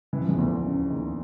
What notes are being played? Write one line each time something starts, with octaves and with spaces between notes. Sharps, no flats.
E3
F3
E2 E3
D2 D3
C#2 C#3
D#2 D#3